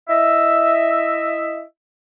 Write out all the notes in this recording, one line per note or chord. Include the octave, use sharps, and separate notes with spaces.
E4 D#5 E5